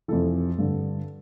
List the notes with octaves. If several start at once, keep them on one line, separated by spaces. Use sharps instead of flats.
F2 C3 E3 A4
G2 D3